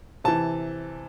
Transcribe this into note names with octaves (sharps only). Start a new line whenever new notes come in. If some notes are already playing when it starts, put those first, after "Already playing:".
C3 E3 A5